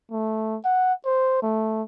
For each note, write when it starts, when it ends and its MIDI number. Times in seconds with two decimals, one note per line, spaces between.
0.11 0.58 57
0.65 0.93 78
1.05 1.38 72
1.42 1.83 57